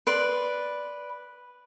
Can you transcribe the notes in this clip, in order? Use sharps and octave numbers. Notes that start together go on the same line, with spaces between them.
B4 D5 C6